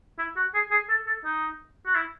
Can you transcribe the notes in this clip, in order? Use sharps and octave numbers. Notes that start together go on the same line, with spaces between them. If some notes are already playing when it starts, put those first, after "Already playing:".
E4
F#4
G#4
G#4
A4
A4
D#4
F#4
E4